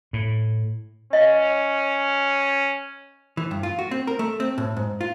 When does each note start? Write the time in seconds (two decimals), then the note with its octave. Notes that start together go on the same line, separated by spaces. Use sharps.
0.13 A2
1.13 C#4 D#5 F5
3.37 E3
3.51 G2
3.63 F4
3.79 F#4
3.91 C4
4.07 A#4
4.19 A3
4.40 C4
4.58 A2
4.76 G#2
5.01 F4